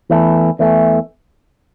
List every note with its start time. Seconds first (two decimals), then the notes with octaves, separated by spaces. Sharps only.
0.10 E2 E3 A3
0.59 E2 E3 A3